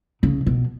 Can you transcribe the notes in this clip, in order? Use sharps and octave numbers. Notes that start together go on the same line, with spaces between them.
C#3
B2